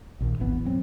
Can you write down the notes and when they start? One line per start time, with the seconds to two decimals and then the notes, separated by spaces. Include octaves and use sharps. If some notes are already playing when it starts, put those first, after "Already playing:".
0.20 A#1 D#2
0.39 D1 G#1 E3 B3
0.65 F#3 C4